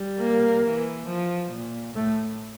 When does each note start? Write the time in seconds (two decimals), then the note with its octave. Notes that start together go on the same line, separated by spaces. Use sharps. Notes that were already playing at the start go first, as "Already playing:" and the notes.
Already playing: G3
0.20 A#3
0.64 E3
1.08 F3
1.52 A#2
1.95 A2 A3